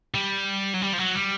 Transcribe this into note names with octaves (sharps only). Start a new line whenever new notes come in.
G3
F#3
G3
F3
F#3
G3